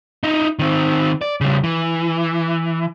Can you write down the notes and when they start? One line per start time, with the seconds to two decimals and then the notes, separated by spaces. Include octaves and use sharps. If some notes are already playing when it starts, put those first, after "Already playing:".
0.23 D#4 E4
0.59 D#3 C4
1.22 D5
1.41 C#3 G3
1.64 E3